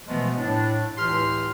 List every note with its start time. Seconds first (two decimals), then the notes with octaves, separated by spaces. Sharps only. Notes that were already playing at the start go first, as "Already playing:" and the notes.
0.08 B2 E3 F3 G#3 A3 B3
0.38 A2 D4
0.98 C#2 A2 E3 G4 C6 F6